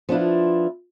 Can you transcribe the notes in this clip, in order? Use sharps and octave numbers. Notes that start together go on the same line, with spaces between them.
F3 B3 D4 E4 F4